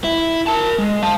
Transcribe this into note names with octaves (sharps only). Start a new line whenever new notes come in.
E4
A#4 A5
G#3
F5 A5